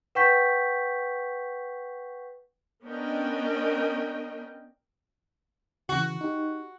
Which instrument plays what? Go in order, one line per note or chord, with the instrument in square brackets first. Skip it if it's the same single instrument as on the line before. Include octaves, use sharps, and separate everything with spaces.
[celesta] B4 F#5 G5 C#6 G6 B6
[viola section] B3 C#4 D4 A#4 D#5 G5
[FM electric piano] C#3 E3 [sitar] F#4
[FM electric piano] D#4 G4